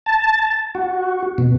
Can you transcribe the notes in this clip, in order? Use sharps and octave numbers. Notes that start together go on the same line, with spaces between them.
A5
F#4
B2